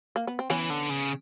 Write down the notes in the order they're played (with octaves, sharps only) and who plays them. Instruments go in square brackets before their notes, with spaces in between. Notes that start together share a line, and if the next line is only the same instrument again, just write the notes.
[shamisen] A#3
B3
C4
[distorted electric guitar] E3 [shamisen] B3 C#4
[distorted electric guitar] D3
C#3